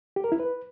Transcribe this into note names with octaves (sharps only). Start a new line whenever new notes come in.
G4
A#4
E4
B4